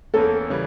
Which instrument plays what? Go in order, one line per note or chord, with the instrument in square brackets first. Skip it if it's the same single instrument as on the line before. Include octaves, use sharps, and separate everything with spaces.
[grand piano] E2 E3 A#3 C#4 [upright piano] A4
[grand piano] C#3 E3 G3